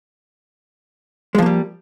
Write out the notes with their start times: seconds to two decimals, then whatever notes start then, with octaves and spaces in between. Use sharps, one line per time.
1.35 G#3
1.38 F3
1.42 A#3
1.46 G3